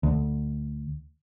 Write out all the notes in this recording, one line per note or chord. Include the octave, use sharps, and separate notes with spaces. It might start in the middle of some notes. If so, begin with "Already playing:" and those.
D2